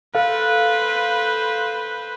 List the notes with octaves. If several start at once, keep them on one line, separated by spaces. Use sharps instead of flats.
A4 B4 C5 F5